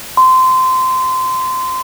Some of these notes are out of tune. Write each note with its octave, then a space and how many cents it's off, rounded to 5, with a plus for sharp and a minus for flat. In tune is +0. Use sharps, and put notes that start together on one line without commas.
C6 -20